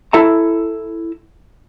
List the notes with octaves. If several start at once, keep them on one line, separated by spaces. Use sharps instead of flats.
E4 A4 E5 A#5